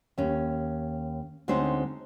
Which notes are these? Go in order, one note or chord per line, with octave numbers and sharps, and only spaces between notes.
D#2 C#4
D2 G#3 C4 C#4 D#4 C5